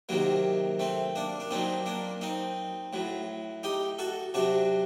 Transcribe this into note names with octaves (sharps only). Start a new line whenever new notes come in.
C3 D#3 F#3 A#3
A3 C4
A#3 D4
D4
A#2 F#3 C4 D#4
A#3 D4
C4 D#4
A2 F#3
D#4 G4
F#4 A4
C3 F#3 D4 F#4